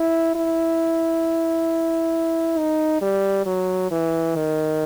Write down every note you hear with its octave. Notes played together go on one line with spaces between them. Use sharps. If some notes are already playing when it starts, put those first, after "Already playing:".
Already playing: E4
E4
D#4
G3
F#3
E3
D#3